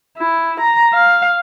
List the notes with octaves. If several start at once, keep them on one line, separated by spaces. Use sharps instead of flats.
E4
A#5
F5